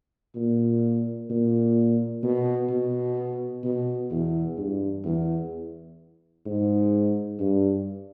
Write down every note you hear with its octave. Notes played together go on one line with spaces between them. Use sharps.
A#2
A#2
B2
B2
B2
E2
G2
E2
G#2
G2